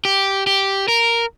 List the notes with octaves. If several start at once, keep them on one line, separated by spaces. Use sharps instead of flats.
G4
G4
A#4